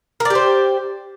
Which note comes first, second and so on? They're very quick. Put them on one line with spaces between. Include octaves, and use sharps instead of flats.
A#4 D5 G4 C5